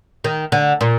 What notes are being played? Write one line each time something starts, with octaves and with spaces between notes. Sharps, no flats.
D#3
D3
A#2